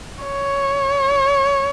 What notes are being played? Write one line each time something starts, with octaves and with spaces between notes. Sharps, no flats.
C#5